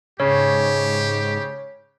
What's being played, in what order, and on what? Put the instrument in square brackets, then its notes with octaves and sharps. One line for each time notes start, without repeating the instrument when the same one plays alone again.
[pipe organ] G#2 [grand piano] C#3 [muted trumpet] G4 [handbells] C#5